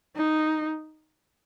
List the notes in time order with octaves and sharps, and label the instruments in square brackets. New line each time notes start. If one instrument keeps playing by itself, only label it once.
[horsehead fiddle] D#4